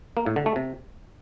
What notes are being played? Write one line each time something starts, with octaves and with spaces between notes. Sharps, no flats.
A#3
A2
D3
A3
C3